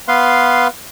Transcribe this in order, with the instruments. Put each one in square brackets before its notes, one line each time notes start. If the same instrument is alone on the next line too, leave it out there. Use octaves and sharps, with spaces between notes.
[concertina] B3 B4 F5 C6